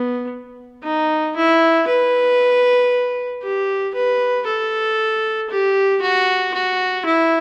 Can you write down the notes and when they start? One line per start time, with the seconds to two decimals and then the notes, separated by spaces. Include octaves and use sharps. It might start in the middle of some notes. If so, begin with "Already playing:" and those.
Already playing: B3
0.83 D#4
1.36 E4
1.88 B4
3.42 G4
3.94 B4
4.47 A4
5.50 G4
6.02 F#4
6.54 F#4
7.05 E4